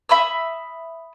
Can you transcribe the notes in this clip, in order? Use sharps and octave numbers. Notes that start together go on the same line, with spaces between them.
E5 B5 D#6 E6